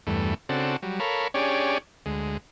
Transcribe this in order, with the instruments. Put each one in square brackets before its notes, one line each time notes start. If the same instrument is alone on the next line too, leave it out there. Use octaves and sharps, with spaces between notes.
[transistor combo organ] E2 G2 A3
C#3 C4 D4 F#4 A4
F#3 G3
A4 A#4 C#5 F5 B5
C#4 D4 G4 G#4 C#5 D5
D2 G#3